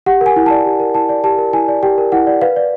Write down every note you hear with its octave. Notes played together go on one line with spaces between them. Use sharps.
G4 F#5
A#4
G#5
E4
D5 A5
G4
A#4
E4 A5
D5
G4 A5
A#4
E4 G#5
D5
G4 G5
A#4
E4 F#5
D5
B4 F5
D5